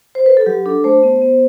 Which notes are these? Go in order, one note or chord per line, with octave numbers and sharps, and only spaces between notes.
C5
B4
A4
F#3 G4
D4 A4
A3 C5
B3
B3